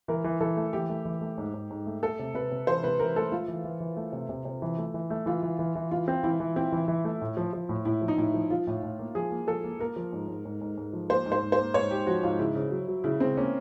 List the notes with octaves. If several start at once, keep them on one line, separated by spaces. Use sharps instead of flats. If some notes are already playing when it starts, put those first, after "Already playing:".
E3 A#4
E3
E3 A4
A3
E3 G4
A3
E3
A3
G#2
G#2
G#2
A3
A3 A4
C3
C3 B4
C3
E3 C5
C3 B4
E3 A#4
A3 A4
A3 F4
E3
E3
E3
A3
C3
C3
C3
E3
A3
E3
A3
E3 F4
E3
E3
E3
E3 F4
C4
E3 E4
E3
C4 E4
E3
E3
A3
A2
F3
F3
A2
A2 E4
F3
D#4
A2 E4
F3
F3 F4
A2
A2
A#3
F3 G#4
A#3
F3 A4
A#3
A#3 A#4
F3
G#2
G#2
G#2
G#2
G#2
F3
A#3 C5
G#2
C5
G#2
C5
A#3
G#2 C#5
G#2 G4
F3 F#4
G#2 F4
C#3 E4
C#3
F#3
F#3
C#3 E4
C#3 C4
A#3 C#4